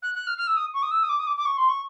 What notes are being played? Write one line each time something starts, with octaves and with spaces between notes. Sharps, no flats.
F#6
F#6
F6
F6
E6
D#6
C#6
D#6
E6
D#6
D6
D#6
D6
D6
C#6
C6
C#6